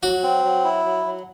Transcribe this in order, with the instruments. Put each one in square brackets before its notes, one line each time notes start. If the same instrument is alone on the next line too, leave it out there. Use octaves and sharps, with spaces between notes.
[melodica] F#3 [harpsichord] F#4
[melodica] C4
F#3
E4
F#3
F#3